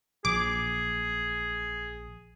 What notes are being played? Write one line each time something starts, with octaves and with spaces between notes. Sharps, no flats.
A#1 G#4 D6